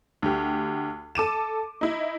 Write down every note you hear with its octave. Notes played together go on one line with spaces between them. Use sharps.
D2 G4
A4 D6 D#7 E7
D#4 E4